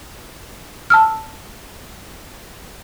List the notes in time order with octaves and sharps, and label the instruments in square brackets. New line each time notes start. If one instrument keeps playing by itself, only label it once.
[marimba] A5 E6 F6